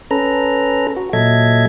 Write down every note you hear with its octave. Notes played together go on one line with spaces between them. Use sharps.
C#4 A4 B4 A#5
F#4
A#2 F#3 A4 D#5 E5 G#6